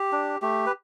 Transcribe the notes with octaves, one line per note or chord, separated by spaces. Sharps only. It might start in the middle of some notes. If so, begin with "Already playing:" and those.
Already playing: G4
D4
A3 G4
B4